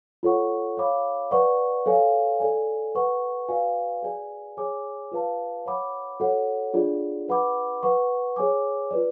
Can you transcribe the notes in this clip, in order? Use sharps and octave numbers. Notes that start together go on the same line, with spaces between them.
F4 A4 C#5 F#5 C#6
C#5 F5 B5 D6
B4 D5 F#5 C#6
A4 C#5 F5 G#5
A4 D5 G#5
B4 F#5 C#6
F#4 B4 D5 F5 G#5
G#4 D5 G#5
G#4 C#5 G#5 D6
F4 B4 F5 A5
C#5 F#5 B5 D6
F#4 A4 C#5 F#5
D4 F4 G#4 D5
B4 F#5 B5 D6
B4 F#5 C#6
G#4 C#5 G#5 D6
F4 B4 D5